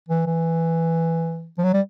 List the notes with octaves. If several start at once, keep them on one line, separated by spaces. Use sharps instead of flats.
E3
E3
F3
F#3
G3